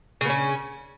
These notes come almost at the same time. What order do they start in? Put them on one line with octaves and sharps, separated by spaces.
C#3 B3 C#4